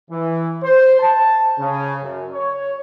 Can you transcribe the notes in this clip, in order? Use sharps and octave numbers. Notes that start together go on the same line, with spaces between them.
E3
C5
A5
C#3
F#2
C#5